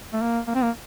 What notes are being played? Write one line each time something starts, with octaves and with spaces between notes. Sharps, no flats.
A3
A#3
A#3
C4
A#3